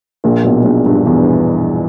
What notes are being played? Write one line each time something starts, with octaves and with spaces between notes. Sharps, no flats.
A#1 A#2
B1 B2
A#1 A#2
G2
E2 E3